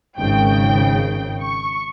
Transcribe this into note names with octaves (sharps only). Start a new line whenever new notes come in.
G#1 C#3 G5
C#6